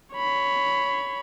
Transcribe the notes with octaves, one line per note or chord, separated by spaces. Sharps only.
C#5 B5